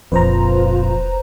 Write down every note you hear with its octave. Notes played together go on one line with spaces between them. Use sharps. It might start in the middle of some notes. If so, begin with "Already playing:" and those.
E1 A#1 F2 F4 B4 C5 A#5